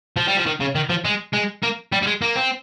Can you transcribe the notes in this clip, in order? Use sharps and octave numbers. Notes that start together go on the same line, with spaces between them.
F3
G3
F3
D#3
C#3
D#3
F3
G#3
G#3
A#3
G3
G3
G#3
A#3
C4